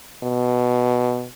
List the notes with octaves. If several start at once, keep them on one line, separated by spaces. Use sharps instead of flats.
B2